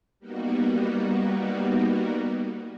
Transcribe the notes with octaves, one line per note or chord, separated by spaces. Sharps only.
G3 A#3 B3 D#4 F#4